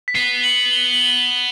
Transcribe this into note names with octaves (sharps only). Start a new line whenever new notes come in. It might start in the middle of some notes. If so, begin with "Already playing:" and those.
B6
B3 C7
F#7
G7
F#7
G7